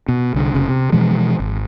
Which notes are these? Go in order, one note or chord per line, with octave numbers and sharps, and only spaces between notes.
B2
C2 D3
F1 C#3
C3
B2 E3 F3 G#3
G#1